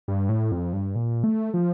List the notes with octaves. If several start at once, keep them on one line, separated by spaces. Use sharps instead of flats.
G2
A2
F2
G2
A#2
A3
F3